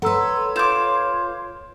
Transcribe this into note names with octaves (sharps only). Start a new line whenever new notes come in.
A4 B4 C#5 F#5 A#5 C6 E6
F4 D6 G6 E7